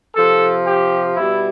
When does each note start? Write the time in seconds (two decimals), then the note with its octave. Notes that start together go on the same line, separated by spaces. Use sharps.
0.16 C3 F3 A4
0.66 G4
1.15 B2 G3 E4